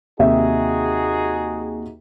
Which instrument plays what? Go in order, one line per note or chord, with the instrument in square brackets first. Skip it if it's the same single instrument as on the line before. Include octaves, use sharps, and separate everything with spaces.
[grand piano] D#2 C3 E5 [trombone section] D#4 F#4 G#4